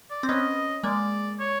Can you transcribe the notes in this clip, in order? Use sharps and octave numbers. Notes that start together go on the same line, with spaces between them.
D5
C4
B3 C#4 D#5
G#3 A#3 D5
C#5